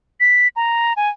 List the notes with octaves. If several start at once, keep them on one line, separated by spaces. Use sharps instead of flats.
B6
A#5
G#5